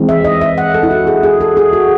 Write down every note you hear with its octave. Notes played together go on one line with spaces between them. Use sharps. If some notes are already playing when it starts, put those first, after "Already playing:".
Already playing: E3 G#3 C4
E5
D#5
E5
F#5
A4
E4
F#4
G#4
G#4
A4
G#4
F#4